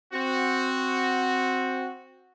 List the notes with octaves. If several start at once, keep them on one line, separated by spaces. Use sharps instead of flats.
C4 F#4